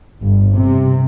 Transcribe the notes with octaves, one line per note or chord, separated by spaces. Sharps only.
G1
C3